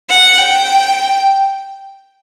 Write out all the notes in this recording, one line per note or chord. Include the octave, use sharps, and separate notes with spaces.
F#5
G5